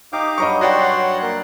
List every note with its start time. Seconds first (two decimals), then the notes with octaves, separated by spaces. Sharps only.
0.13 D#4 G4 D#5 F5 D6
0.38 G2 F#3 D#5 A#5 B5 C#6
0.61 F#4 C#5 D5 F#5 G5 C6
1.22 A#3 A#4 F#6